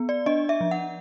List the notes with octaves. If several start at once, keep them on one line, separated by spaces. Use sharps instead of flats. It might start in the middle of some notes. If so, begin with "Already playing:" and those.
Already playing: B3
D5
D4 D#5
E5
F3
F#5